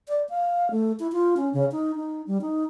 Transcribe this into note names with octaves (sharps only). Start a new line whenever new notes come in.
D5
F5
A3
E4
F4
C#4
C#3
D#4
D#4
G3
D#4